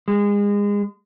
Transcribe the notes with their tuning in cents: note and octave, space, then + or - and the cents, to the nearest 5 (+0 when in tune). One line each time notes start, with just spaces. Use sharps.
G#3 -30